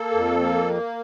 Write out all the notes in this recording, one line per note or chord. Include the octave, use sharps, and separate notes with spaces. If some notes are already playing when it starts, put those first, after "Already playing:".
Already playing: A#3 A4
F2
A#3